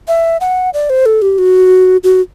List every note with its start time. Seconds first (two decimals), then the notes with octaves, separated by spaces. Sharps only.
0.08 E5
0.41 F#5
0.74 D5
0.90 C5
1.06 A4
1.22 G4
1.38 F#4
2.04 F#4